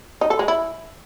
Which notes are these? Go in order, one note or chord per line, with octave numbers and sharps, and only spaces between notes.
D#4
A4
G#3
E4